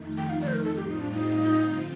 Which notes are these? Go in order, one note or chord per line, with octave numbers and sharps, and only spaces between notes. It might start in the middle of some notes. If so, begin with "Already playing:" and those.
Already playing: F2 D#3 A3 D#4
G5
F5
D5
C5
A#4
A2 G3 C4 F4 A4
G4
D#4
D4
D#4
G2 D3 F3 C4 F4